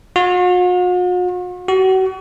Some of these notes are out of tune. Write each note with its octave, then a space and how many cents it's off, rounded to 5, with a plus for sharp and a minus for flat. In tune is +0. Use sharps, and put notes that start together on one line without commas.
F#4 -45
F#4 +35